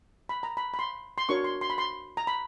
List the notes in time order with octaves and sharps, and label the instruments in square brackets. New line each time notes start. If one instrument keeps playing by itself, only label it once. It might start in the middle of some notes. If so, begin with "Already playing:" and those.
[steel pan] B5
A#5
B5
B5
C6
C6
D4 F#4 A#4 C#5 C#6
C6
C6
B5
C6
A#5
B5